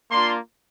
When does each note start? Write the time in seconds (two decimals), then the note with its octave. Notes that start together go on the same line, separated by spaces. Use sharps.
0.11 A#3 D4 F4 C6